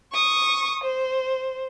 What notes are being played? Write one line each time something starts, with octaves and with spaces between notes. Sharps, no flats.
C#6 D#6
C5